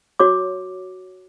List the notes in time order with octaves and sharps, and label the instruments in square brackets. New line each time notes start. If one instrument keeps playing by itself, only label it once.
[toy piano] F#4 C#5 D6